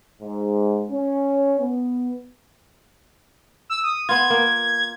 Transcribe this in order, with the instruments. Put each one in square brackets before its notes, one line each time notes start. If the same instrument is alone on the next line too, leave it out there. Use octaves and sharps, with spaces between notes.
[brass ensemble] G#2
C#4
B3
[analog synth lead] E6
D#6
[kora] B3 F4 [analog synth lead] G#6
[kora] A#3